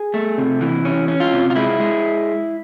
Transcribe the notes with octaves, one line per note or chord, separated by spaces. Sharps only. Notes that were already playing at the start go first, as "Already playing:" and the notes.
Already playing: G#4
A3
C3
E3
C#4
C#4
F4
C3
F4
G#3 E4
G#3